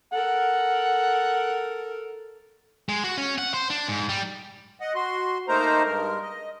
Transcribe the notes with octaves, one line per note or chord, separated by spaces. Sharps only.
A4 A#4 F#5
G#3
F#4
C#4
F#5
C5
D4
G#2
G3
D#5 F#5
F#4 C6
A3 A#3 D#4 A#4 C5 A#5
G2 G#3 A#4
D#5